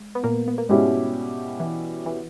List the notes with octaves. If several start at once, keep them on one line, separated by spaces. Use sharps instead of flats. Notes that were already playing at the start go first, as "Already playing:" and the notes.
Already playing: G#3
B3
A#2 A#3
B3
A#3
G#2 B2 G3 G#3 C#4 E4 G4
E3
E3